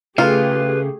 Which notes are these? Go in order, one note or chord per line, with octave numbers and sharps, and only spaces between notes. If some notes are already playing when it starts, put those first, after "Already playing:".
C#3 A3 F4 G4 G#4 B4